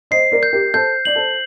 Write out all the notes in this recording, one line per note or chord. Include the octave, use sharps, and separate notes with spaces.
C5 D#5 C7
A#4 D5
G6
G4 A#4
A4 C5 G6
D5 F#7
A4 C5